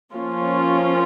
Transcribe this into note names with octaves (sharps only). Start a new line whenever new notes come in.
F3 A#3 C#4 F4